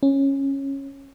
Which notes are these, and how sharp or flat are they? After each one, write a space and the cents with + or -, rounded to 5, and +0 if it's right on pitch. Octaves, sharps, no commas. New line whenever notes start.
C#4 -15